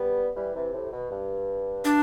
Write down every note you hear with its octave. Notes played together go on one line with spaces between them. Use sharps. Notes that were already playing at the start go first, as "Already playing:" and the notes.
Already playing: G3 B3
E3 G3
C3 E3
A2 C3
B2
G2
D4